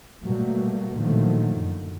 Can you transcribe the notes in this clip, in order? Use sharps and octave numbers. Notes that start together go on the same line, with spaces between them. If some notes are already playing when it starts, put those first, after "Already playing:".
B2 F#3 G3 A3 A#3
A#2 D3 D#3 F3 F#3 A3
F#2